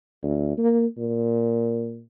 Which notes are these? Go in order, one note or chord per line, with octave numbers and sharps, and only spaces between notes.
D2
A#3
A#2